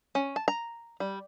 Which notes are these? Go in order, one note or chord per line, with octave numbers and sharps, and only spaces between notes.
C#4
A5
A#5
G3